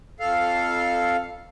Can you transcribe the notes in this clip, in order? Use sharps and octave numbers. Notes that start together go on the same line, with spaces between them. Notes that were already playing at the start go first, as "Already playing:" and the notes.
F2 A4 F5